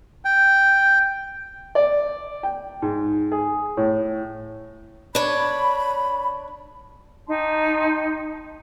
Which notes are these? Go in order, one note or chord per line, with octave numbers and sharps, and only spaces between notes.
G5
D5
G5
G#2
G#4
A2
D4 C#5 B5
D#4 G4 A5 C6